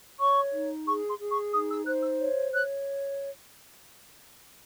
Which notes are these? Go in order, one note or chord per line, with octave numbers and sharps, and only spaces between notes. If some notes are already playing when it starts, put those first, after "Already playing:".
C#5 C#6
D#4
G#4 C#6
C6
G#4
C#6
D#4 D#6
E6
C5 F#6
E6
C#5
C#5 F#6